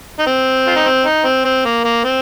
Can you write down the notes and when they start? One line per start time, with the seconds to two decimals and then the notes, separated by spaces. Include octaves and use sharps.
0.19 D#4
0.27 C4
0.67 F4
0.76 D#4
0.85 C4
1.05 D#4
1.25 C4
1.45 C4
1.65 A#3
1.85 A#3
2.04 C4